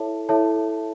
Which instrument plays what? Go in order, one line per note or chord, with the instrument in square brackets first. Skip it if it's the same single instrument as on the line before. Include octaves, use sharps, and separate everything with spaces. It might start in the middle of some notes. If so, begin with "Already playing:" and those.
Already playing: [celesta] E4 A4 C#5 E5 A5
E4 A4 C#5 E5 A5